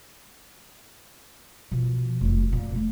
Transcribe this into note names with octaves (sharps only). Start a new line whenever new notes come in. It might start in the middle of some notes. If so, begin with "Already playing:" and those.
B2 F3
F1 F#2
A#2
A3